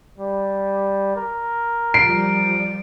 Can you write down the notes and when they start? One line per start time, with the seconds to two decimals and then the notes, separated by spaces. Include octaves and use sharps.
0.18 G3
1.16 A#4
1.94 F3 G3 C7 D7